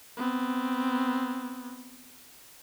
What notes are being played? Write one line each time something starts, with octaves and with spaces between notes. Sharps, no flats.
B3 C4